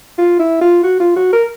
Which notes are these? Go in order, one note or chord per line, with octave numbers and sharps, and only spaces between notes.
F4
E4
F4
F#4
F4
F#4
A#4